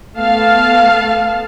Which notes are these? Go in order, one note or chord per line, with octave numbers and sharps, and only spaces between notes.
A3 B3 F5 A5